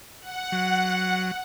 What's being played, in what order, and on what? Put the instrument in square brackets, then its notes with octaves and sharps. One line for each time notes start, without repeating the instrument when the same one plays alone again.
[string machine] F#5
[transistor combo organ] F#3